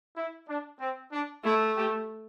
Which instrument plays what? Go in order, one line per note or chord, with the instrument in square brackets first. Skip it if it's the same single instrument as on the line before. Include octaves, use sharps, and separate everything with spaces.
[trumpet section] E4
D4
C4
D4
[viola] A3 [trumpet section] E4
[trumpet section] G4